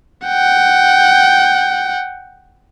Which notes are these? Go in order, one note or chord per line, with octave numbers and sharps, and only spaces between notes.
F#5 G5